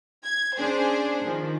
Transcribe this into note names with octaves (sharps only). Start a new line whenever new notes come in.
G#6
C#4 D4 G#4 C5
D#3 F3